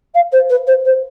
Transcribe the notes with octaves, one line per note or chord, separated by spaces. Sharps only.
F5
C5
B4
C5
C5